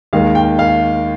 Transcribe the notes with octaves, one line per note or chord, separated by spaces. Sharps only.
D#2 D#3 G#3 F5
G5
F5